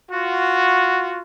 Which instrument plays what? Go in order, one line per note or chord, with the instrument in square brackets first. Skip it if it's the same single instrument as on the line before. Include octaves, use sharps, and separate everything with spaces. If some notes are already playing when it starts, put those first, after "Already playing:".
[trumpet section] F4 F#4